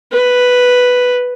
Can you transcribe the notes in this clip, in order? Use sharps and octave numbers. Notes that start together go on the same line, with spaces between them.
B4